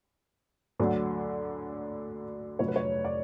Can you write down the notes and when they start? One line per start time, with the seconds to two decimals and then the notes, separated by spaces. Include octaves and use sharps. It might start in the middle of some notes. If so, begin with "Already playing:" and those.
0.79 D2 D3 F#3
2.59 F1 F2 D3 F#3 C#5
2.68 B4
2.76 C#5
3.04 D5